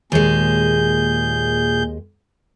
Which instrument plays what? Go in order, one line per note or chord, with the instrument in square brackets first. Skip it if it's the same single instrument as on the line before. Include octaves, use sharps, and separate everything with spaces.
[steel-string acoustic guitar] D#2 G#3 [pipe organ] A#2 G#4 G6